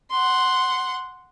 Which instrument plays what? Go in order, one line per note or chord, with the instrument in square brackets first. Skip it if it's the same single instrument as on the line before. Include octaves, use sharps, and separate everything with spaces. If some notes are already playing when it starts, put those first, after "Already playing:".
[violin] F#5 C6